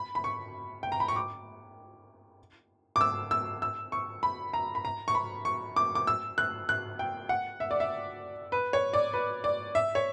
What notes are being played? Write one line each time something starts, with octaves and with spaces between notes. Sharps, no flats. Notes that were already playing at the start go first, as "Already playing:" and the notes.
Already playing: B5
B5
C#6
G5
A#5
B5
C#6
D6
D6
E6
E6
E6
C#6
B5
A#5
B5
A#5
C#6
B5
C#6
D6
D6
E6
F#6
F#6
G5
F#5
E5
D5
E5
B4
C#5
D5
B4
D5
E5
C#5